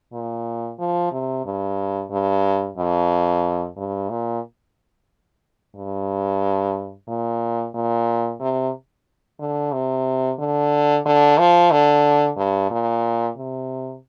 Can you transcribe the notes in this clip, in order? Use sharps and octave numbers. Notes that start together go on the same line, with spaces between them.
A#2
F3
C3
G2
G2
F2
G2
A#2
G2
A#2
A#2
C3
D3
C3
D3
D3
F3
D3
G2
A#2
C3